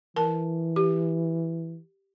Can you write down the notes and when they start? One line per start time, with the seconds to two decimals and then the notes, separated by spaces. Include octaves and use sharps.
0.16 E3 A#4 A5
0.76 G4